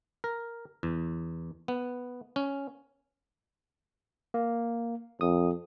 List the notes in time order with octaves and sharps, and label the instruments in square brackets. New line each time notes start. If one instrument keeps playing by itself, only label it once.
[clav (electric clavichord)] A#4
E2
B3
C#4
[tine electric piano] A#3
[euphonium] F2 [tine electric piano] D#6